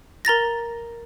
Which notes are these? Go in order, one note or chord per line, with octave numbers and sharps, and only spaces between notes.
A#4 A#5 A6 A#6